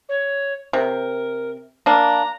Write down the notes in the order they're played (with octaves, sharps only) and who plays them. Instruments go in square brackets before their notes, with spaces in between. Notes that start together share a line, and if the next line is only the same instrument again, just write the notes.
[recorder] C#5
[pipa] C3 [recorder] A#4
[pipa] A#3 D4 [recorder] A#5